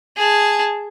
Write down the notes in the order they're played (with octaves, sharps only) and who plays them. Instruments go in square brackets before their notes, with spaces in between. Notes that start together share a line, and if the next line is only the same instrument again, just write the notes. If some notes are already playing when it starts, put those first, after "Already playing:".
[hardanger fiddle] G#4 A5